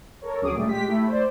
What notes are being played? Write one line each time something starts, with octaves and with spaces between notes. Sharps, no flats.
A4 A#4 C#5
D2 F#3 C#4 G#4 D6 D#6
A#2 G3 A3
G#3 G4 B6
A3 E4
C5 D5